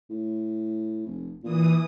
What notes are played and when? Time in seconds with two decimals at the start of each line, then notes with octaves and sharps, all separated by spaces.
0.10 A2
1.06 F1
1.44 A#2 E3 D#6